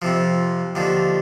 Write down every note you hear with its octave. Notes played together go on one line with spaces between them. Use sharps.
F2 C3 F3
D#2 D3 F3